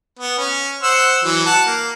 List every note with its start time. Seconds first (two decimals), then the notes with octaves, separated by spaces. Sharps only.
0.19 B3
0.38 C#4
0.83 C5 F#5 E6
1.24 E3 F#3
1.46 F#5 A5
1.66 A#3